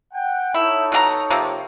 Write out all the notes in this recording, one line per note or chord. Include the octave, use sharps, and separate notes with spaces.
F#5 G5
D#4 E4 A4 C#5
B2 D4 A#5
C3 F3 A#3